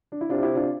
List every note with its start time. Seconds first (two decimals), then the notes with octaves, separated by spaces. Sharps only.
0.12 D4
0.21 E4
0.30 C3 D4 F4
0.43 E4 G4
0.55 D4 F4